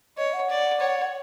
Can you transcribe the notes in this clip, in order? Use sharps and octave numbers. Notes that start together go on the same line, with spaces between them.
C#5 D#5
F#5
D5
C#5